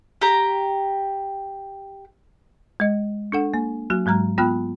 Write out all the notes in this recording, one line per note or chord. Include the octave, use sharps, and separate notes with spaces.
G4 A#5
G#3 D#5
D4 A4 F#5
A#3
F#3 A#3 F#4
G#2 F#3 G#3 A#5 F6
B3 F4 G5 B5 F6 F#6